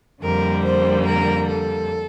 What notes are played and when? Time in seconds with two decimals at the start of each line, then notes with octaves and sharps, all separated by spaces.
0.23 F2 D3 G3 A#3 A#4
0.64 C5
1.06 A#4
1.48 A4